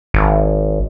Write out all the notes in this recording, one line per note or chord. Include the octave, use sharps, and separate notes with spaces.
G#1